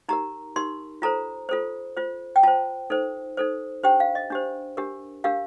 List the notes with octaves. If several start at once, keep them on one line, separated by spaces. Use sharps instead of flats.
D#4 G4 A#4 A#5
D#4 G4 A#4 C6
F4 A4 C5 A#5
F4 A4 C5
F4 C5
G5
F4 C5 A5
D#4 A4 C5
D#4 A4 C5
D4 G4 C5 G5
F5
D#5
D4 G4 C5
D4 G4 A#4
D4 G4 A#4 F5